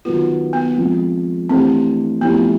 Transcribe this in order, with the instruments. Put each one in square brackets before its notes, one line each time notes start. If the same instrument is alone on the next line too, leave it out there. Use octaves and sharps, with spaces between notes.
[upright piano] D#3 F#3 B3 [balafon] F4
[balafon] B3
[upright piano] F3 G#3 C4
[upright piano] E3 A3 D4 G4 C5 [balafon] C4
[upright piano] F3 A3 C#4 E4 G4 [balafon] B3